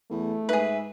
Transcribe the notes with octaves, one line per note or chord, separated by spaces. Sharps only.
E2 A3
G#2 G#4 B4 E5